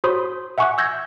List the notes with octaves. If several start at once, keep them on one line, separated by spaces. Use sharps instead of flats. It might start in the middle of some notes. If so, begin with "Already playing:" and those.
F#4 C5 C#5 B5 C6 D#6
E5 F#5 G#5 C#6 D6 F#6
E6 G6 G#6 A#6